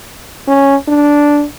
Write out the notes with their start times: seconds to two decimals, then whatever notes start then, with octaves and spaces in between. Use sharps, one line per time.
0.47 C#4
0.88 D4